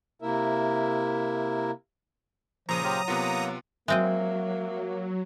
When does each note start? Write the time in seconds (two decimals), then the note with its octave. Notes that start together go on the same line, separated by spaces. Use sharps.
0.22 C3 A#3 E4 A#4 E5
2.69 A#2 C#3 F3 A#5 D#6
2.84 F#3 G4 C5 F5
3.08 C3 A#3 B3 F4 F#5
3.88 F#3 G#3 A#3 C4 D#5 E5